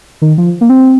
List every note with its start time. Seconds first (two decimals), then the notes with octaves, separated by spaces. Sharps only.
0.22 D#3
0.38 F3
0.61 A#3
0.70 C4